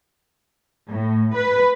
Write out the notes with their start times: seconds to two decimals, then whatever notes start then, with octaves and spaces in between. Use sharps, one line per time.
0.89 A2
1.34 B4